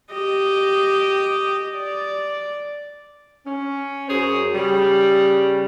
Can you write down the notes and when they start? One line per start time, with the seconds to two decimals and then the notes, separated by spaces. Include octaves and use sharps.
0.13 G4 D#5
1.77 D5
3.46 C#4
4.08 F#2 F#3 G#4 C5 C#5
4.54 C#3 G3